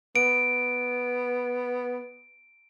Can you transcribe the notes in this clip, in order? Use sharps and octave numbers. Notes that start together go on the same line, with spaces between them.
B3 D7